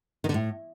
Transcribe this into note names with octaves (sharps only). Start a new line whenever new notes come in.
D#3
D3
A2